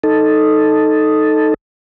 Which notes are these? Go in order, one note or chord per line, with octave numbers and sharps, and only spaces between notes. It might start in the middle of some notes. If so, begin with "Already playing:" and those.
D#4 A4